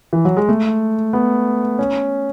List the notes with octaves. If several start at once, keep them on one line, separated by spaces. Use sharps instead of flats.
E3
F#3
G#3
A3
B3
C#4